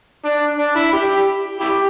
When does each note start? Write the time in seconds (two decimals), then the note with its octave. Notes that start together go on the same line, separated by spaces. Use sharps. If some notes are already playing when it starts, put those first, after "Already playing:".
0.25 D4
0.58 D4
0.75 E4
0.93 G4
1.60 E4 G4